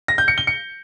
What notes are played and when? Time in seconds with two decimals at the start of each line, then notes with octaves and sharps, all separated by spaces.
0.08 A#6
0.18 G6
0.28 C#7
0.38 G7
0.47 C#7